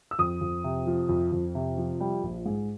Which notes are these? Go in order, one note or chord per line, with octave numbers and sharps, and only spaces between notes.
E6
F2 D#6
F2
C3
F3
F2
F2
C3
F3
G3
A#1
G#2